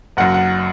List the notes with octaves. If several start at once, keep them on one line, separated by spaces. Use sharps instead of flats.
F#1 F#2 F#3 F#5
F#5